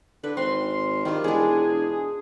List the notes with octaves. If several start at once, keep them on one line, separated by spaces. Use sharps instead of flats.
D3 B4
G#1 C4 C6
D#3 G3 F4
E1 G#3 D4 G#4